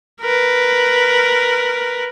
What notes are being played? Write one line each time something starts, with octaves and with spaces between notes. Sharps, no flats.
A#4 B4